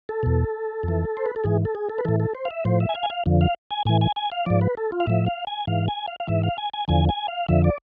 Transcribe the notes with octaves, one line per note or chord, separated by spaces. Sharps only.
A4
E2 B2
F2 E3
C5
B4
A4
G#2 E3 G#4
A4
G#4
A4
B4
A2 E3 A4
A4
C5
F5
E5
A2 F3 C5
E5
G#5
F5
G#5
F5
F2 D3 F3
F5
G#5
A2 E3 G#5
G#5
G#5
F5
G#2 F3 D5
B4
A4
F4
F5
A2 F3 E5
F5
G#5
G#2 E3 F5
G#5
F5
F5
G#2 E3 E5
F5
G#5
G#5
E2 D3 F3 G#5
G#5
F5
F2 D3 F3 E5
D5